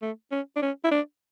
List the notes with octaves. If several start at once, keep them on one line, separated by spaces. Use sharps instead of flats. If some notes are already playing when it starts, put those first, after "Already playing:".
A3
C#4
D4
C#4
E4
D4